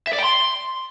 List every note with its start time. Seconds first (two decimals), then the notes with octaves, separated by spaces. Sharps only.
0.07 E5
0.13 D5
0.18 G5
0.24 C6